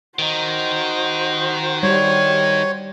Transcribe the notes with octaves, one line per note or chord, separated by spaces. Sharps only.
D#3 D#4 F#4 C5
G3 C#5